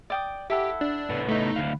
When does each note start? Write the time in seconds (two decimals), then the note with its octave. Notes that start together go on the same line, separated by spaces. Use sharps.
0.10 D5 G5 D#6
0.50 E4 G4 A4 F#5
0.81 D4
1.10 A2 B3
1.29 A3 D#4 B4
1.56 D2 F5